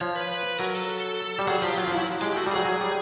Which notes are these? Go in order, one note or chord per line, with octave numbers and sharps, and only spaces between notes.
F3 C#5
B4
F#3 A#4
A4
G3
F#3 G#4
F3 G4
F#3 F4
F3
F#3 E4
G#3 G4
A3 F#4
G3
F#3 G#4
F#3
G3